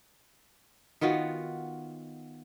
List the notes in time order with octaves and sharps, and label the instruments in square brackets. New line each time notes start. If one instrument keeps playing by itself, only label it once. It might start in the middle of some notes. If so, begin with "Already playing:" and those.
[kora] D#3 B3 F4 F#4